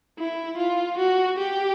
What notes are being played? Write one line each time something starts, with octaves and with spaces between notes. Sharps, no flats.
E4
F4
F#4
G4